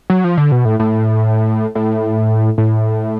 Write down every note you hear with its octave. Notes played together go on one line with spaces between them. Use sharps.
F#3
F3
D3
B2
A2
A2
A2
A2